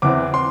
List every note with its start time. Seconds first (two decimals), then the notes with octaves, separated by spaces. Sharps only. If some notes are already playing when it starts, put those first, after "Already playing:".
0.02 E2 E3 C4 D6
0.34 C6